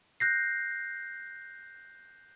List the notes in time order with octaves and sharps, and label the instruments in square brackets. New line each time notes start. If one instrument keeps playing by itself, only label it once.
[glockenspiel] F#6 G6 A#6 C7